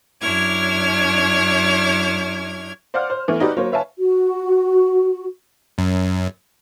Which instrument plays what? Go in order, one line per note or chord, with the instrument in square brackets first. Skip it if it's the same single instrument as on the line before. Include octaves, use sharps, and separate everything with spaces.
[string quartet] F#2 D4 E4 C#5 F6 G#6
[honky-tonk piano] C5 D5 F5 F#5 F6
C5
E3 A3 B3
D#4 F#4 G4 B4 D5
F#3 A#3 C5 C#5
B4 C#5 E5 F5 G#5 A5
[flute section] F#4
[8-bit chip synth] F#2